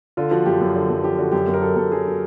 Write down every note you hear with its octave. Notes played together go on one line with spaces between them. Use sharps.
D3 F4
F3 F#4
F#2 G4
F#2
D3
F#2
F3 G4
D3 F#4
F#2 G4
F#2
A#4
F#3 A4
F#2 A4
F#3 G#4
F#3